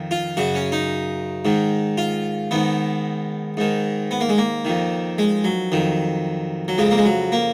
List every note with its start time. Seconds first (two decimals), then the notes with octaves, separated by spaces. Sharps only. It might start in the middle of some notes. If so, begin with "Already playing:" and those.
Already playing: F2 D#3
0.11 F4
0.37 F#2 C#3 F#4
0.55 C#4
0.72 D#4
1.45 G#2 D#3
1.98 F4
2.51 G#2 D#3 B3
3.57 G#2 D#3
4.11 B3
4.21 A#3
4.29 G#3
4.38 A#3
4.65 F2 D#3
5.18 G#3
5.44 F#3
5.72 F2 D#3
6.68 F#3
6.78 F2 C#3 G#3
6.91 A#3
6.98 G#3
7.05 F#3
7.32 A#3